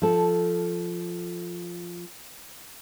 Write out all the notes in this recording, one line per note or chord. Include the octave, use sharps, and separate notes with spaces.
F3 A4